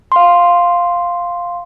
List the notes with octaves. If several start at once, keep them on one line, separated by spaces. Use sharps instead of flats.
F5 C6